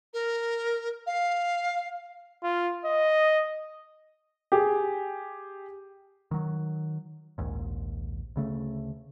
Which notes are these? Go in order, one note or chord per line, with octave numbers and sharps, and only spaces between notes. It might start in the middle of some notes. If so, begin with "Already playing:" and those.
A#4
F5
F4
D#5
G4 G#4
D#3 F#3
A#1 D#2 G#2
D2 C#3 A3